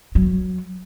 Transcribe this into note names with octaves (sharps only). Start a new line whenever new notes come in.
F#3